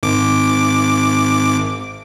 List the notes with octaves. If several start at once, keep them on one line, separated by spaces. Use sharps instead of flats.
G#1 D6